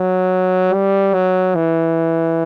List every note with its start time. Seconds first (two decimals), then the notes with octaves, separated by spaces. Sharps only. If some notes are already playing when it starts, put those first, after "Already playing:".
Already playing: F#3
0.74 G3
1.14 F#3
1.55 E3